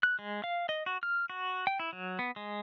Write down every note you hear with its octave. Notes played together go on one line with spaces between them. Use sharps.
F#6
G#3
F5
D#5
F#4
F6
F#4
G5
E4
F#3
B3
G#3